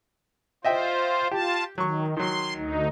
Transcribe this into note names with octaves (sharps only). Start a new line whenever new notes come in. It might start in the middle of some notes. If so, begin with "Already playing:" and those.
F4 C5 D#5 E5 G5
F4 G4 A5
D#3 F#3 C#6
D#3 F#3 C6
D2 D#4